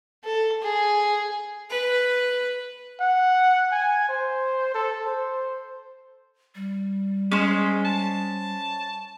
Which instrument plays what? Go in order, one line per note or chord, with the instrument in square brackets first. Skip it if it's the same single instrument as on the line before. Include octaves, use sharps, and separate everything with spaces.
[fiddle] A4
G#4
B4
[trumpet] F#5
G#5
C5
A4
C5
[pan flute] G3
[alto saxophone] G#3 [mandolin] C#4 C5
[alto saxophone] A5